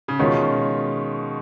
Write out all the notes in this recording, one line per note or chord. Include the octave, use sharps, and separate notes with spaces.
C#3
B2 D#3 G#3 C#4 F4